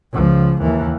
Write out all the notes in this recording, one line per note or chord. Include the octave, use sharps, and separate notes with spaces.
C#2 F3
D#2 E3